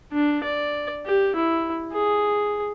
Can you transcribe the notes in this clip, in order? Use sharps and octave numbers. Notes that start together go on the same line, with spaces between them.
D4
D5
G4
E4
G#4